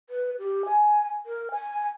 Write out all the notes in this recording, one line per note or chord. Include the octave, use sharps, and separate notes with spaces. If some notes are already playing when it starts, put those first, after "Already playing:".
B4
G4
G#5
A#4
G#5